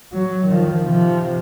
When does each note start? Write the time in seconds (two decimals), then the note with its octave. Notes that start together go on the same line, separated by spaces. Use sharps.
0.12 F#3
0.47 D#3 F3
0.83 C3 F3